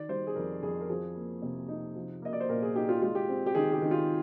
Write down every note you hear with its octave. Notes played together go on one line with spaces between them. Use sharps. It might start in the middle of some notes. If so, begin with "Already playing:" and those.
Already playing: D#3 D5
G3 C5
G#4
F2 A#4
F2 G#4
A#4
F3 G#4
A#3
C3
D#4
F3
A#3 D#5
D5
C5
A#2 A#4
G#4
D#4 G4
F4
G#3 F4
G4
C4
G4
D#3 G#4
G4
D#3
F4